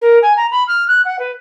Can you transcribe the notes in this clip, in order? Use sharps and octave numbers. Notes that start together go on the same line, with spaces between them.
A#4
G#5
A#5
B5
F6
F#6
F#5
B4